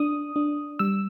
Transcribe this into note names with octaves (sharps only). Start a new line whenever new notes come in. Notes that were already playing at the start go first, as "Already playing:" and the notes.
Already playing: D4 D#6
D4
G3 E6